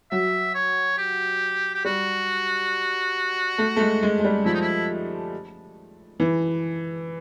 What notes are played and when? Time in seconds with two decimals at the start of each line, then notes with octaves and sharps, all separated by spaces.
0.11 F#3 E5
0.54 C#5
0.98 G4
1.74 G4
1.85 G3 F#4
3.58 A3
3.76 A3
3.81 G#3
4.03 G#3
4.19 G#3
4.25 G3
4.45 F3 E4
4.54 D#4
4.61 E4
6.20 E3